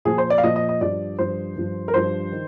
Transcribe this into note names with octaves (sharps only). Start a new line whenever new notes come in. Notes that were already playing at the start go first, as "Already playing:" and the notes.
A#2 F3 G#4
C5
D5
F5
A#2 F3 D#5
D#5
D#5
G2 F3 D5
G2 F3 C5
G2 F3
A#4
G2 F3 C5
D#3